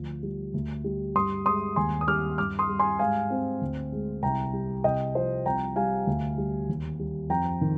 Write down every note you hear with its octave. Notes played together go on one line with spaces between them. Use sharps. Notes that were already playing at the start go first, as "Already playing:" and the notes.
Already playing: D2 F3
G3
D2
G3
G2 C6 D#6
G#3 C6 D#6
D#2 G#5 C6
D#6
G3 D6 F6
G2 D6 F6
C6 D#6
G3
G#5 C6
G#2 F5 G#5
C4
D2
G#3
C2 G5 A#5
G3
C2 D#5 G5
F3 C5
C2 G5 A#5
G3 F5 G#5
D2
G3
D#2
G3
F2 G5 A#5
D#3